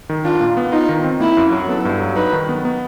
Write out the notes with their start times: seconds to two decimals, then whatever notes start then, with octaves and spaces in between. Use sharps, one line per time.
0.09 D#3
0.25 D4 F4
0.41 A#2
0.57 B3
0.72 D#4 F4
0.89 D#3
1.04 C4
1.20 A#3 E4
1.37 F#2
1.52 F#3
1.69 B3 A4
1.85 G2
2.01 F#3
2.16 D#4 B4
2.33 D#3
2.49 B3
2.65 B3